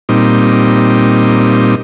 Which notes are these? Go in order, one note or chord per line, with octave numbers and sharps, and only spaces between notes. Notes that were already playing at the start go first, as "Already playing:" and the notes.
A#2 G3 C4 D#4